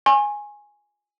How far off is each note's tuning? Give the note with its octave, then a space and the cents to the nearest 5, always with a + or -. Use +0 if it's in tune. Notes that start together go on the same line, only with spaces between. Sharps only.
G#5 +0 C#6 -45